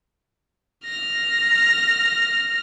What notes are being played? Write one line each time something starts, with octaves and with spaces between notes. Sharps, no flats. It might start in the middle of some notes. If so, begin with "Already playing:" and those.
F6 A#6